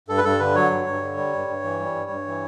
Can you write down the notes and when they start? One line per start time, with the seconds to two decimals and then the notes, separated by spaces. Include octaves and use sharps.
0.08 G2 A4
0.18 B4
0.24 G2 A4
0.39 D3 B4
0.55 F#3 C#5
0.71 G2
0.86 G2
1.02 D3
1.17 G3
1.33 G2
1.48 G2
1.64 E3
1.80 G3
1.95 G2
2.10 G2
2.27 E3